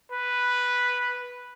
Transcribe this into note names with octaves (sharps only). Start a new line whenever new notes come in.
B4